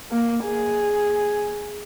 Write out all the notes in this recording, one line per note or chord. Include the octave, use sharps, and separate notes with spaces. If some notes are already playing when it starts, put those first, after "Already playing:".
A#3
G#4